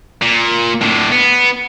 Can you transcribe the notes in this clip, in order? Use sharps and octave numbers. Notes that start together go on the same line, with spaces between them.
A#2
A2 D3
B3